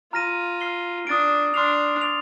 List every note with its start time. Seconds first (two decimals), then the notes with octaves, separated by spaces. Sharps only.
0.13 F4 A#5 F6 A#6 D#7
0.61 F6 C7 G7
1.07 D4 D#6 A6 D7
1.54 D4 C6 F6 C7 F7
2.01 D6 A6 D7 F7